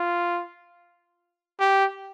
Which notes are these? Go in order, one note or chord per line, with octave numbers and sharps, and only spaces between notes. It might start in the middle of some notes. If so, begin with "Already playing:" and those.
Already playing: F4
G4